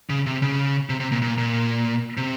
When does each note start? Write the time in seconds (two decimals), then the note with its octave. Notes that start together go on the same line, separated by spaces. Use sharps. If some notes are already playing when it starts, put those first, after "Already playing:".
0.10 C#3
0.26 C3
0.42 C#3
0.89 C3
1.00 C3
1.12 A#2
1.22 A#2
1.38 A#2
2.17 C3